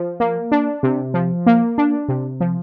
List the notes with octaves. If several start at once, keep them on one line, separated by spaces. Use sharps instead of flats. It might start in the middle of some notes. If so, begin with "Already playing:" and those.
Already playing: F3
A#3
D4
C3
F3
A#3
D4
C3
F3